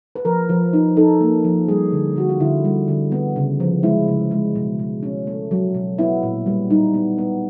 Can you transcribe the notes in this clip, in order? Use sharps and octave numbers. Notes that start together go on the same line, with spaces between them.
B4
F3 A#4
F3
D#4
D#4 A4
A#3
F3
G3 G#4
D3
D3 F#4
F4
D3 E4
G3
D3
B3
C#3
F3
G#3 E4
C#3
G#3
B2
B2
C#4
A3
F#3
B2
B3 E4
A#2
G3
G3 D#4
B3
B3